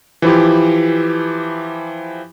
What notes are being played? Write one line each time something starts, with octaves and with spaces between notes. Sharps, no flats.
E3 F3 E4 G4